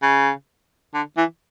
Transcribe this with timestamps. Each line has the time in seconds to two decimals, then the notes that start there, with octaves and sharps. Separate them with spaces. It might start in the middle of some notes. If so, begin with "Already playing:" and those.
0.02 C#3
0.94 D3
1.17 E3